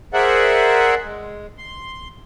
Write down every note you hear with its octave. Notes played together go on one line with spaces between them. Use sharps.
G#4 A#4 C5 D5 E5 F#5
G#3
C6